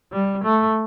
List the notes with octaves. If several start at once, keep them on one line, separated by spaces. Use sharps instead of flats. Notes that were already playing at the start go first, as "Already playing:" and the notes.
G3
A3